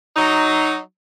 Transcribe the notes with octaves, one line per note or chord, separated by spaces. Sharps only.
F#3 D#4